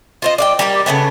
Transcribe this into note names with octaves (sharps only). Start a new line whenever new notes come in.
F4 C5 D#5
D5 F5 G5
G3 A#3 D#4 G4
C#3 E3 A3 B3